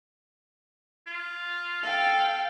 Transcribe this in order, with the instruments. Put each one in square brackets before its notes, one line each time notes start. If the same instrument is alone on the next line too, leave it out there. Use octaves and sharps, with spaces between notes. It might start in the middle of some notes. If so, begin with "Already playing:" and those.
[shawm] F4
[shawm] A4 [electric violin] F5 G5